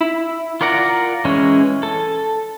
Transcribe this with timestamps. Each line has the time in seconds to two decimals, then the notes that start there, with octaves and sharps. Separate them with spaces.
0.01 E4
0.61 F4 A#4 D5 F#5 A#5
1.25 E3 G#3 C#4
1.83 A4